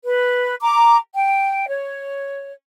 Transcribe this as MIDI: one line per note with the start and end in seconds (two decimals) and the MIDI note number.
0.05 0.54 71
0.62 0.96 82
0.62 0.96 86
1.15 1.66 79
1.69 2.53 73